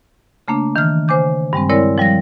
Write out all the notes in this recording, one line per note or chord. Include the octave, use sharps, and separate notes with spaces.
C#3 A3 A#3 D4
D#3 E3 F6
C#3 C5 G#5 D6 G6
G2 G3 G#3 C4
G#3 C4 E4 A#4 C#5 D5
F3 G3 F5 A#6